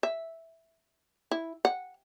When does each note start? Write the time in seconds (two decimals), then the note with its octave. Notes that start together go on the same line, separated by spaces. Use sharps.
0.03 E5
1.31 E4
1.65 F#5